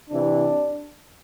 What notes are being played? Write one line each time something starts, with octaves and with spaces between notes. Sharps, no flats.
C3 E3 D4